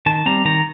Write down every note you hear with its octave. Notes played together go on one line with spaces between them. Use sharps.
D#3 A5
G3 C4 A#5
D#3 A#5